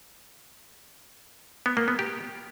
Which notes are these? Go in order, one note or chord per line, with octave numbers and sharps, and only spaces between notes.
B3
A#3
B3
G4